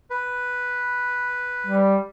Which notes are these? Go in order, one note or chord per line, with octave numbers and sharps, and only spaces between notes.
B4
G3